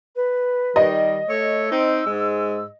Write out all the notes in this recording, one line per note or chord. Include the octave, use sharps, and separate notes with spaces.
B4
D#3 G3 D#5
A3 C#5 E6
C4 D#4
G#2 G#3